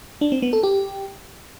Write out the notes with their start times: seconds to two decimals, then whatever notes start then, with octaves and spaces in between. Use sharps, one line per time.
0.21 D4
0.32 C4
0.42 B3
0.53 A4
0.63 G4